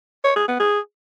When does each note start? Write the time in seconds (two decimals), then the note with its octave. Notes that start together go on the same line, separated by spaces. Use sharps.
0.24 C#5
0.36 G#4
0.48 B3
0.60 G#4